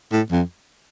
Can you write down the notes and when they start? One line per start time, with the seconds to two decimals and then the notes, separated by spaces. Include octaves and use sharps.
0.12 A2
0.31 F2